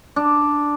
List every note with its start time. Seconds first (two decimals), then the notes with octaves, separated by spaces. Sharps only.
0.16 D4